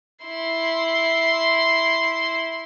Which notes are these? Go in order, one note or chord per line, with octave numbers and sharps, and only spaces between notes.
E4 C6